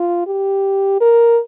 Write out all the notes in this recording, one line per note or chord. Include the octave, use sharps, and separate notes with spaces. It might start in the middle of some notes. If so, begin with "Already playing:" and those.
Already playing: F4
G4
A#4